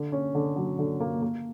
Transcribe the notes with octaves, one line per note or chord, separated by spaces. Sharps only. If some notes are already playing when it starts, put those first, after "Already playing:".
Already playing: D3
C#4
D3
F#3
D3
A#3
A#3